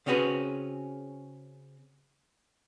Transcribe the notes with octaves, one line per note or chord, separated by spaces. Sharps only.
C#3 C4 C#4 F#4 G#4 B4